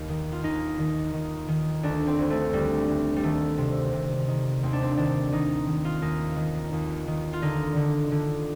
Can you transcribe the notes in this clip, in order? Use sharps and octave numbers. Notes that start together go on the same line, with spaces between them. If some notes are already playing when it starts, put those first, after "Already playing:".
Already playing: D#2
D#3
F4
D#2 D#4
D#3
D#3
D#3
D2 D4
C4
D2
A3
D2 G3
D2
G3
D#3 A3
C3
C3
D#3
D#2 C4
D4
C4
D#3 D4
D#3 D#4
D#3
F4
D#2 D#4
D#3
D#2
D#3
F4
D3 D#4
D3
D3